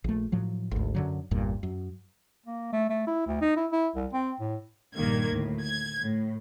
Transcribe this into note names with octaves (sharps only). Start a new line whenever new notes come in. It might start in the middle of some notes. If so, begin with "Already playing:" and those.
A#1 A3
A2 F3 F#3
G#1 D2
F#2 D3 F#3
G1 E2 G2 A#2
F#2
A#3
A3
A3
E4
D2
D#4
E4
E4
C2
C4
A2
A#1 G2 D#3 A#3 G#6
D2 A2
G#6
A2